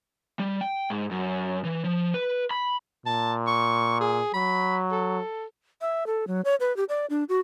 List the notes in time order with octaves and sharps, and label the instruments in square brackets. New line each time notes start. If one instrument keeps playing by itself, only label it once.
[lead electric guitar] G3
G5
G#2
F#2
E3
F3
B4
B5
[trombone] A#2 [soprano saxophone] A5
[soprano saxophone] C#6
G#4
[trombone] F#3 [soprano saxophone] B5
[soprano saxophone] A4
[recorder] E5
A4
F#3
C#5
B4
G4
D5
D4
F#4